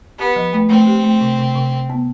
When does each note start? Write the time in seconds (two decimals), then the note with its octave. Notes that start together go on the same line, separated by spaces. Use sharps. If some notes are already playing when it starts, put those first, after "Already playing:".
0.18 B3 G4
0.36 F3
0.53 A3
0.70 A3 C4
0.87 G4
1.04 A3
1.21 C3
1.38 C3
1.55 C3
1.72 C3
1.90 B3